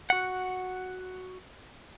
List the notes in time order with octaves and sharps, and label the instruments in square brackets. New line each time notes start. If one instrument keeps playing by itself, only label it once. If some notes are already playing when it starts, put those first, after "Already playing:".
[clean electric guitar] F#4 F#5